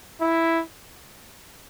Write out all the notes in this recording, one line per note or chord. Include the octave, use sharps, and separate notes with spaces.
E4